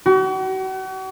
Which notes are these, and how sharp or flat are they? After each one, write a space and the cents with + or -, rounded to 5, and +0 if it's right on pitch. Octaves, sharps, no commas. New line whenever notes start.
F#4 +40